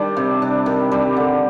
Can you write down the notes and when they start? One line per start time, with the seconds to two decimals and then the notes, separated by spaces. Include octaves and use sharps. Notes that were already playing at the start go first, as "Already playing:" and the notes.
Already playing: D#3 G3 D4
0.17 C3
0.42 D4
0.66 D#3
0.92 G3
1.17 D3